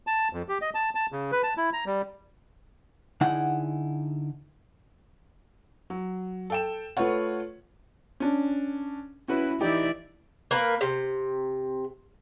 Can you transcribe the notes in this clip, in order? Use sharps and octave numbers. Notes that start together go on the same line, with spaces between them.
A5
F2
G4
D#5
A5
A5
C#3
B4
A5
E4
A#5
G3
D3 D#4 E4 G#4 F#5
F#3
A4 G5 E7
A3 F4 B4 C#5 F#5
C#4 D4
C#4 E4 F#4 B4
E3 D#4 E4 G4 D5
A#3 A#4 B4
C3